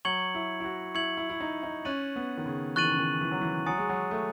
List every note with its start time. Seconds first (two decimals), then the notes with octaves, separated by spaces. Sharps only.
0.05 F#3 C#6 G#6 C#7 F#7
0.35 E4
0.60 E4
0.65 F#4
0.95 E4 C#6 G#6 C#7 F#7
1.17 E4
1.30 E4
1.40 D#4
1.63 D#4
1.85 C#4 C#6 F#6 A6 D#7 F#7
2.16 B3
2.37 D#3
2.46 C#3
2.76 E3 C#6 F#6 A6 D#7 F#7
2.84 D#3
2.91 C#3
2.99 D#3
3.21 E3
3.31 F#3
3.41 E3
3.66 F#3 G#5 D#6 A6 C#7
3.78 G#3
3.89 F#3
4.11 A3